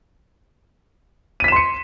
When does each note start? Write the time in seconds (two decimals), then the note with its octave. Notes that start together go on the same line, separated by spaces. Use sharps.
1.40 D#7
1.44 B6
1.48 E7
1.52 C6
1.56 C#7